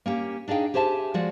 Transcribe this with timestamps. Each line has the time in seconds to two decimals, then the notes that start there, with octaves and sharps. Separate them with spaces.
0.06 A#3 C#4 G4
0.48 D4 D#4 G#4 F5 G5
0.74 G4 G#4 C5 E5 A5
1.14 F3 G#3 F#4 D5